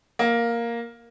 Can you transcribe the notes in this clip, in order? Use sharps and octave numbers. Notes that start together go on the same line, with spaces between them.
A#3